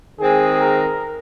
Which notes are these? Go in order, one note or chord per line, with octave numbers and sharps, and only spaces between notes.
D#3 G#3 C4 G#4
A#4